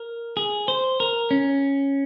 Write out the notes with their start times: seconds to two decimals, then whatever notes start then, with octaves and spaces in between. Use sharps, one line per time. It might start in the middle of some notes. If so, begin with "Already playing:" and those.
Already playing: A#4
0.37 G#4
0.68 C5
1.00 A#4
1.31 C#4